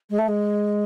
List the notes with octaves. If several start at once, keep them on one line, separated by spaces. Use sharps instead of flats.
G#3
A3
G#3